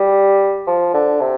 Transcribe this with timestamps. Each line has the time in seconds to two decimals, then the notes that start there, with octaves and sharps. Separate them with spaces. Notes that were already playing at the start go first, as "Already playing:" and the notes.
Already playing: G3
0.67 F3
0.94 D3
1.20 C3